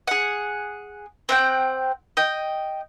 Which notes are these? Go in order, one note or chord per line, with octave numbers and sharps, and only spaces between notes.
G#4 F#5
C4 F#5 G5
D#5 G5